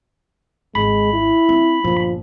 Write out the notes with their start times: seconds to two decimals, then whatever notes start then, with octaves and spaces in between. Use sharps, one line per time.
0.75 G#1 G#3 B5
1.13 E4
1.49 C4
1.84 G1 A#2 F3